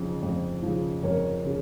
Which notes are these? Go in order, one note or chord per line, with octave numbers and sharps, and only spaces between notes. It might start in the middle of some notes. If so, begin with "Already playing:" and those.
Already playing: F2 C#3 F3
F2
C#3 F3
F2 A#4 C#5
C#3